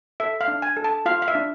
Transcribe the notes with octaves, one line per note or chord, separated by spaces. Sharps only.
A4 E5
F5
D4
G#5
A4
A5
F4 F5
F5
E5
D4